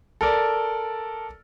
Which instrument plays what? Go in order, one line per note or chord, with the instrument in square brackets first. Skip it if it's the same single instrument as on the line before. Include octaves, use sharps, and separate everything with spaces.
[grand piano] A4 A#4 D5